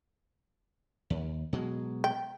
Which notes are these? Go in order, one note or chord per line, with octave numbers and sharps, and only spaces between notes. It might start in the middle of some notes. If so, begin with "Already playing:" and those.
D#2
B2 F#3 G#3
G5